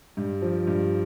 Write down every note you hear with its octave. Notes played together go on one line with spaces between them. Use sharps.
G2
F3
G2